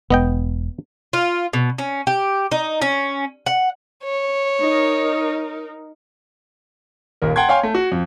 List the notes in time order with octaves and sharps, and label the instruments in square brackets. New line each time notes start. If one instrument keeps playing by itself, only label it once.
[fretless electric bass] E1 [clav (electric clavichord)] B3 D#5 G5
[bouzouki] F4
B2
C#4
G4
D#4
C#4
F#5
[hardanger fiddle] C#5
[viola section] D#4 A#4
[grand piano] D#1 D#2 A#4
F#5 G5 A5 C6 G#6
C#5 F5 G5 G#5 C6
A3
F#4
F2